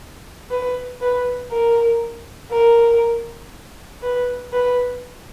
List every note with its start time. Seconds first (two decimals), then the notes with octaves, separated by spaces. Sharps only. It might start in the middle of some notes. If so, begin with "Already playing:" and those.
0.50 B4
1.01 B4
1.51 A#4
2.52 A#4
4.03 B4
4.53 B4